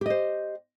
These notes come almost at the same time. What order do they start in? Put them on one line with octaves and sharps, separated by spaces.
G4 D#5 C5